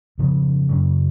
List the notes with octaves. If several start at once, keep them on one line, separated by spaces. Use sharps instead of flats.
F2 C#3 F3 B3
F#2 C#3 F#3